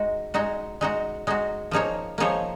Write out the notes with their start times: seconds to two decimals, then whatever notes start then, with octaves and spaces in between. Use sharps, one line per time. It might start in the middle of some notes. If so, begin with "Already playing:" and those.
Already playing: G#3 D#4 F#4
0.34 G#3 D#4 F#4
0.81 G#3 D#4 F#4
1.27 G#3 D#4 F#4
1.71 F3 A#3 D#4 G#4 C#5
2.18 F3 A#3 D#4 G#4 C#5